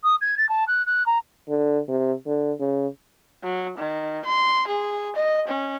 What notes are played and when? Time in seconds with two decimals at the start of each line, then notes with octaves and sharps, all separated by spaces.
0.04 D#6
0.21 G#6
0.38 A6
0.49 A5
0.68 F#6
0.86 F#6
1.06 A#5
1.49 D3
1.89 C3
2.27 D3
2.60 C#3
3.44 F#3
3.78 D#3
4.25 C6
4.67 G#4
5.16 D#5
5.47 C#4